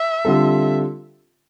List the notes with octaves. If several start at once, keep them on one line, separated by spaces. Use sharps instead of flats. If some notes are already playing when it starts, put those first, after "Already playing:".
Already playing: E5
D3 G3 C4 F4 A4